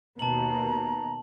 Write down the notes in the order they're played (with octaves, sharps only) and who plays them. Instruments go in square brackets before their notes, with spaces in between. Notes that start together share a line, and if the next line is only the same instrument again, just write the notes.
[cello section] D#2 B2 [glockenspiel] A5 F#7 [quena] A#5